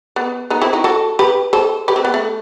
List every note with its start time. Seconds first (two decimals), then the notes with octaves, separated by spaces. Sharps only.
0.16 B3
0.50 B3 D#4
0.61 C4 E4
0.73 D#4 F#4
0.84 F#4 A4
1.19 G4 B4
1.53 A4 C5
1.88 G4 B4
1.96 C4
2.05 B3
2.14 A3